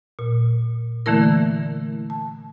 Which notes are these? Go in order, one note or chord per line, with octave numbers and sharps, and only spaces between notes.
A#2
D3 E3 A3 A#3 E4 A#4
A5